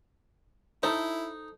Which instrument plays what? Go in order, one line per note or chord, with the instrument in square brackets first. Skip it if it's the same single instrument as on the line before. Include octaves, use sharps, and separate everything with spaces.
[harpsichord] D#4 [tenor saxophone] E4 [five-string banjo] A4 C5